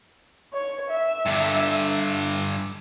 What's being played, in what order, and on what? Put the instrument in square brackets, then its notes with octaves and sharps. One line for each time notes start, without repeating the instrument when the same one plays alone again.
[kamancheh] C#5
E5
[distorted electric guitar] G2 D3